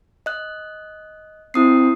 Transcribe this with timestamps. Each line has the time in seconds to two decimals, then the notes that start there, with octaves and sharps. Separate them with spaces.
0.26 D#5 F#6
1.54 C4 E4 D#6 C7